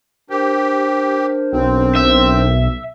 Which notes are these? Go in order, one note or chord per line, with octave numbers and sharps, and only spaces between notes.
D4 G4 A#4 C5
B1 C4
E5